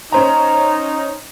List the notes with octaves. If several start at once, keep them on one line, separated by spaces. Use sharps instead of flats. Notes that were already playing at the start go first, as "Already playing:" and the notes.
C#4 D#4 C5 A#5